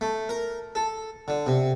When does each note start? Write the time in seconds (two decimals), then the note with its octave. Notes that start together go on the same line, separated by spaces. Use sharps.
0.01 A3
0.29 A#4
0.75 A4
1.28 D3
1.46 C3